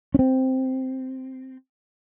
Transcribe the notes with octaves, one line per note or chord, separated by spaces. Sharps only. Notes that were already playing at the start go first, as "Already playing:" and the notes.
C4 C#4